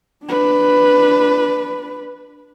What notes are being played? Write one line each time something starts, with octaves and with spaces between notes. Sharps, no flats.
D4 B4